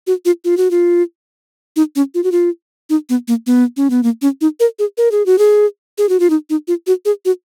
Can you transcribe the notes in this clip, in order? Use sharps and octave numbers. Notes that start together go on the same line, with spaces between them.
F#4
F4
F4
F#4
F4
D#4
C#4
F4
F#4
F4
D#4
B3
A#3
B3
C#4
B3
A#3
C#4
D#4
A#4
G#4
A#4
G#4
F#4
G#4
G#4
F#4
F4
D#4
D#4
F4
F#4
G#4
F#4